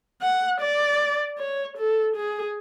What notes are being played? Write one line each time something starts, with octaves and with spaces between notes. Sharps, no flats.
F#5
D5
C#5
A4
G#4